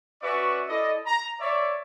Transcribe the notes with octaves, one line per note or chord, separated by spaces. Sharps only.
C#4 F#4 B4 D5 E5 C#6
E4 A4 D5 D#5
A#5
C#5 D5 E5